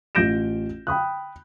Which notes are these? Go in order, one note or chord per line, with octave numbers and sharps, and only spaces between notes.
A1 F4 G6 A#6 D7 E7
G5 B5 D#6 F#6